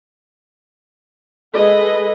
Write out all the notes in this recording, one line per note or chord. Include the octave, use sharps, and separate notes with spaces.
G#3 G#4 A4 B4 D#5